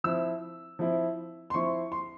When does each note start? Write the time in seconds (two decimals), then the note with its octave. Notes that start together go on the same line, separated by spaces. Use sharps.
0.04 F3 C4 E4 E6
0.79 F3 C4 E4
1.50 C6
1.54 F3 C4 E4 C#6
1.92 C6